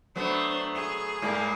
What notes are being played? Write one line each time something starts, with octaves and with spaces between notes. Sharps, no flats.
F#3 A3 B3 D4 C5
G#4
G#2 G3 A#3